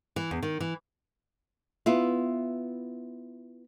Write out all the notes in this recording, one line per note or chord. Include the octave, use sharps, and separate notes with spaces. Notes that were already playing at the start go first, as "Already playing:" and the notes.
E3
E2
D#3
E3
B3 E4 F4